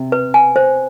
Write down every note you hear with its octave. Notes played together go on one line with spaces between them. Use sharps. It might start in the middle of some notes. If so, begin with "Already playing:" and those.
Already playing: C3
B4
G#5
C5